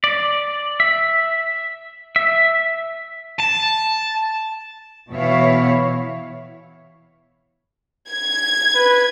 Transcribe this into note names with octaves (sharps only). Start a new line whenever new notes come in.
D5
E5
E5
A5
B2 E3 E4 C#5 E5 F5
G#6
B4